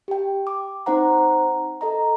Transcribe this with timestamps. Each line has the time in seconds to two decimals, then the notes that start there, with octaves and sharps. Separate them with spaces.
0.08 G4 G5
0.47 D6
0.86 C4 D#4 C5 F#5 A#5
1.81 A4 D#5 A#5